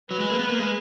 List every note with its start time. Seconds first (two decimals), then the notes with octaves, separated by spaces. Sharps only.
0.11 F#3 B4
0.20 G#3
0.30 A#3
0.39 B3
0.49 A#3
0.60 G#3